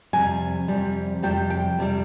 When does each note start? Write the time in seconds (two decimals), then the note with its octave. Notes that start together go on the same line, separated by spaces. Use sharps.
0.13 F2 C3 G3 G#5
0.68 F2 C3 G3
1.23 F2 C3 G3 G5
1.50 G5
1.79 F2 C3 G3